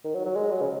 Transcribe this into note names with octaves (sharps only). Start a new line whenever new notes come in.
D#3
F#3
F#3
G#3
F#3
C#3